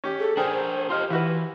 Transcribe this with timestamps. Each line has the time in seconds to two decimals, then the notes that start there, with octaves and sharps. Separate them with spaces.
0.04 C#4 G4
0.19 G#4 A4
0.37 D4 G#4 A#4 C5 G5 A#5 F6
0.90 F4 G4 D#5 C6 F6
1.10 E3 E4 F#4 B4 F5